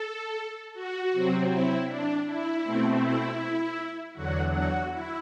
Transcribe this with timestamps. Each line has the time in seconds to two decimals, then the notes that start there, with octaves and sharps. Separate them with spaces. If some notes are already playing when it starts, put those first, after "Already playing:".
Already playing: A4
0.73 F#4
1.11 C3 F#3 C4
1.49 E4
1.86 D4
2.25 E4
2.62 B2 A3 C4
3.00 E4
4.13 E2 D3 F#3 F#4
4.52 F#4
4.89 E4